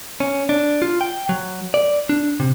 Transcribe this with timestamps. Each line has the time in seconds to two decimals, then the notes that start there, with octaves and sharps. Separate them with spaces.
0.20 C#4
0.49 D4
0.82 F4
1.01 G5
1.29 F#3
1.74 D5
2.09 D4
2.40 C3